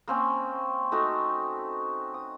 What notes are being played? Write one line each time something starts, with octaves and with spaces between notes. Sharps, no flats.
A#3 C4 C#4
A3 D#4 F#4
D#6